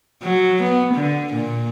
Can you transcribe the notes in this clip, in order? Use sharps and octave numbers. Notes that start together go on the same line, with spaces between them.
F#3
B3
D3
A#2